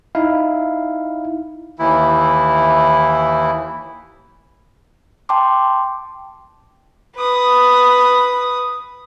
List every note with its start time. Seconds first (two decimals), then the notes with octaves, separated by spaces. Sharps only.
0.15 D#4 E4 F5
1.79 D#2 E3 E4
5.29 G5 A5 C6 D6
7.16 B4 D#6